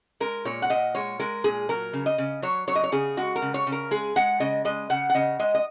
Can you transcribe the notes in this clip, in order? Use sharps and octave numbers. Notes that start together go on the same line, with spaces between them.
G#3 A#4
A#2 C#5
F#5
A#2 D#5
G#3 C#5
G#3 A#4
A#2 G#4
F#3 A#4
C#3
D#5
C#3
F#3 C#5
F#3 C#5
D#5
C#5
C#3 G#4
G#3 F#4
A#4
C#3
C#5
C#3
A#4
G#3 G#4
G#3 F#5
C#3 D#5
G#3 D#5
C#3 F#5
F#5
C#3 D#5
G#3 D#5
D#5